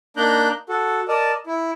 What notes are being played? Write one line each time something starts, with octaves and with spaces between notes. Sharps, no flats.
A#3 D4 D#4 A#5 F#6 G6
F#4 A4
A#4 D5 D#5 A5
E4